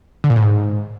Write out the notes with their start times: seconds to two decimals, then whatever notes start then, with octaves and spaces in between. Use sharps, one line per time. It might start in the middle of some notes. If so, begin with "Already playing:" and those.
0.24 D3
0.30 A#2
0.36 A2
0.42 G#2